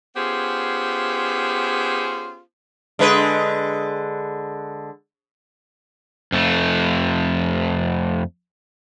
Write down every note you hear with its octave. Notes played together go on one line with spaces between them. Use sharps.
B3 C#4 F4 G4 G#4 C5
D3 G#3 B4
F2 A3